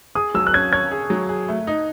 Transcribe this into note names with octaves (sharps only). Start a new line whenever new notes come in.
G#4 D#6
F#3 E6
F#6
C#4 G#6
C#5 G#6
G#4
F#3
G#4
A3
D#4